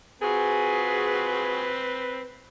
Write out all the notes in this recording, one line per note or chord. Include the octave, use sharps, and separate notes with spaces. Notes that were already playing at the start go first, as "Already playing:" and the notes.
C4 F4 F#4 G#4 B4